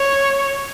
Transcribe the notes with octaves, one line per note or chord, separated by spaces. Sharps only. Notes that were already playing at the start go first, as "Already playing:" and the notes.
Already playing: C#5